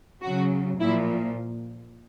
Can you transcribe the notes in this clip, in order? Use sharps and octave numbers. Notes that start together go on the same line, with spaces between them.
C#3 F#3 F#4
A#2 F3 E4